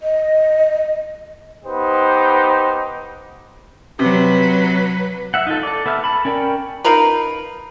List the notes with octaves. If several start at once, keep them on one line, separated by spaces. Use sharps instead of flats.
D#5
B3 D#4 G4 B4 C5
C3 F#3 B4
E5 F#5
D#4 F4 A4
A4 D5
B3 A4 E5 F6
A5 B5
C#4 A#4 D5 G5
D#4 F4 A#4 B4